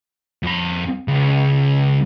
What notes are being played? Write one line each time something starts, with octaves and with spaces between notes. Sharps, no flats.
F2 B5
C#2